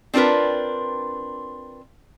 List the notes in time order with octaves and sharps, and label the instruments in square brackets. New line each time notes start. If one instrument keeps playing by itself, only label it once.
[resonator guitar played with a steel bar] C4 D4 F4 A#4 B4